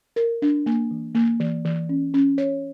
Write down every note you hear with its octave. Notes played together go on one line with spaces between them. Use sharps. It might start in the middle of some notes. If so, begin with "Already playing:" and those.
A#4
D4
A#3
E3
A#3
E3
E3
C#4
C#4
C#5